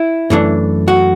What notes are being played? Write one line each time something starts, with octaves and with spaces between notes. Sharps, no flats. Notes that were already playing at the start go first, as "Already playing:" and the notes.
Already playing: E4
F#2 E3 A3 D4
F#4